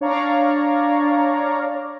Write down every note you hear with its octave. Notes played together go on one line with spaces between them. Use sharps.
D4 C#5 D5 F5 A#5 C#6